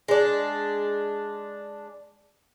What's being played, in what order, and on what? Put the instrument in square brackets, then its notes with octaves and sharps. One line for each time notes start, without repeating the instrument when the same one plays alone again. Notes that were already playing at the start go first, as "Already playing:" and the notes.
[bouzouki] G#3 D4